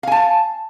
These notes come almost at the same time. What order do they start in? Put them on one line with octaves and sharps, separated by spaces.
F5 G#5 A5